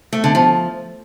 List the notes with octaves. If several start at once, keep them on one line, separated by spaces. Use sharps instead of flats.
A3
D3
F3